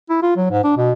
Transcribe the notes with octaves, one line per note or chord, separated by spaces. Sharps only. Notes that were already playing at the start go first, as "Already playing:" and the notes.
E4
F4
F#3
G#2
D4
B2